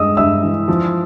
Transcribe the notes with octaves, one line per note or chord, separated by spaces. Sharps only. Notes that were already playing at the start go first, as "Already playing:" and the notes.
Already playing: G2 G#3 D#5 D#6 E6
G2 E5 E6
E3
F3